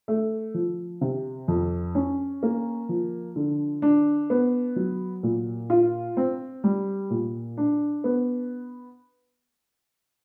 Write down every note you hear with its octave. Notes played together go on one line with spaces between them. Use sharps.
A3
F3
C3
F2
C#4
A#3
F3
D3
D4
B3
F#3
A#2
F4
C4
G3
A#2
D4
B3